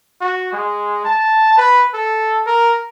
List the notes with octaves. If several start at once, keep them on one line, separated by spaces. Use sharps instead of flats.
F#4
G#3
A5
B4
A4
A#4